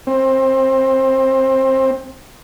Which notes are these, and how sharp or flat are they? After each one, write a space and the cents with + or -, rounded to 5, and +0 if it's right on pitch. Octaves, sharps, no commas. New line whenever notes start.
C4 +20